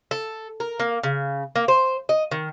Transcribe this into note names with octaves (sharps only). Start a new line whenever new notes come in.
A4
A#4
A#3
C#3
A#3
C5
D#5
D#3